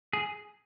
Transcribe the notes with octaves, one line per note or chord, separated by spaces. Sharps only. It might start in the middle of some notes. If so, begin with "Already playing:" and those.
G#4